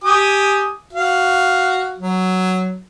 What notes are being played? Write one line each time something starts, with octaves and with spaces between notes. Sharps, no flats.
G4 G#5 D#6
F#4 F5
F#3